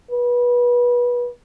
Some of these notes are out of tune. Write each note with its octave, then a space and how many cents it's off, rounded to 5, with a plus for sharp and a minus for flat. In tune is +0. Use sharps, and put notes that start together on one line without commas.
B4 -25